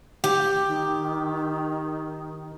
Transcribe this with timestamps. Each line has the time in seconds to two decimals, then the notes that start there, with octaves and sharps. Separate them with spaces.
0.24 G4
0.67 D#3